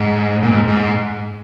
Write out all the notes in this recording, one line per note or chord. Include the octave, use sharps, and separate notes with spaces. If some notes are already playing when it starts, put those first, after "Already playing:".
Already playing: G#2
A#2
G#2
G#2